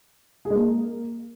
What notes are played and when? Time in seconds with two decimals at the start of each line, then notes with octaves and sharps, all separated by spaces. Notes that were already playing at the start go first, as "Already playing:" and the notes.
0.45 G#4
0.50 G#3
0.55 A#3